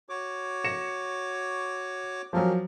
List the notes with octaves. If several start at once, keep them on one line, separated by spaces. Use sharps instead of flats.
F#4 C#5 D6
A#6 C#7 E7
F3 F#3 C#4 G4 A#4